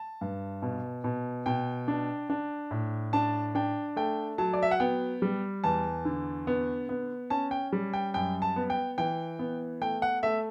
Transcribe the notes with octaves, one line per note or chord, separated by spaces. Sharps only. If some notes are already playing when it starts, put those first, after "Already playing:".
Already playing: A5
G2
B2
B2
B2 G5
D4
D4
A2
D4 A5
D4 G5
A3 G5
F#3 A5
D5
E5
F#5
B3 G5
G3
E2 A5
D3
B3
B3
C#4 A5
G5
G3
G5
F#2 G5
A5
B3
G5
E3 G5
B3
A3 G5
F#5
A3 E5